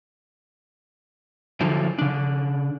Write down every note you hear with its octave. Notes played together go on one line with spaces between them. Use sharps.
D3 F3 F#3 E4
C#3 D4